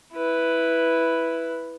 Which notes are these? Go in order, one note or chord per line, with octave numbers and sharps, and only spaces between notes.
E4 B4